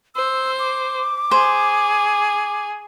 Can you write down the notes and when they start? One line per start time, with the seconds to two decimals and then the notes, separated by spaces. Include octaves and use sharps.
0.15 C5 E6
0.59 D6
1.31 G#4 C5